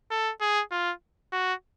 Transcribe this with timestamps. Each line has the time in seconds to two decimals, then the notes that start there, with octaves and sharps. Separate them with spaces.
0.11 A4
0.41 G#4
0.71 F4
1.32 F#4